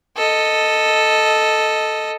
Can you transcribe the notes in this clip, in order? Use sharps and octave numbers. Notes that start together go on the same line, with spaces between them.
A4 D#5